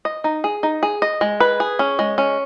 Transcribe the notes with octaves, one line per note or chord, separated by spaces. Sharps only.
D#5
D#4
G#4
D#4
G#4
D#5
G#3
B4
G#4
C#4
G#3
C#4